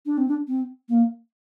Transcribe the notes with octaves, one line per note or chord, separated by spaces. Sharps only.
D4
C4
D4
C4
A#3